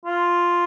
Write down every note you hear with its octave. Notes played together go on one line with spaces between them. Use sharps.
F4